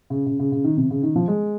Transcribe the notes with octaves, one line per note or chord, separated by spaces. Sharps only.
C#3
C#3
C#3
C#3
D#3
C3
C#3
D#3
F3
G#3